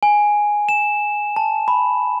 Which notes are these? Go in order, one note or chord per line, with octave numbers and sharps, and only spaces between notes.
G#5
E7
A5
B5